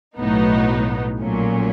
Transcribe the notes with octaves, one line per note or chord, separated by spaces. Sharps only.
B1 A2 F#3 B3 D#4
A#1 A#2 F#3 A3 C#4